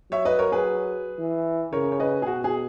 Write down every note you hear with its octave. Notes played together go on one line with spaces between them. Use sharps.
F#3 C#5 E5
B4 D#5
A#4 C#5
G#4 B4
E3
C#3 A#4 C#5
C#5
B4 D#5
G#4
B2 F#4
G#4